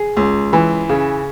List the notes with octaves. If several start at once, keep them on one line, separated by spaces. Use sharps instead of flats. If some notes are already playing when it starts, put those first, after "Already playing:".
Already playing: G#4
C#2
E3
C#3